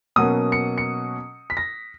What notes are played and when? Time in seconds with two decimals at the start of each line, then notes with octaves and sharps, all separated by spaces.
0.16 B2 F#3 A#3 C#4 D#6
0.52 C#7
0.78 C#7
1.50 B6
1.57 A#6